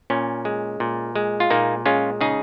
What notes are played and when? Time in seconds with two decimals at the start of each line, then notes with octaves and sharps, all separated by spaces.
0.10 A#2 C#4
0.45 G#3
0.80 A#2
1.16 G#3
1.40 F4
1.50 A#2 A#3 D#4
1.86 G#3 C#4 F4
2.21 C#3 D#4 G#4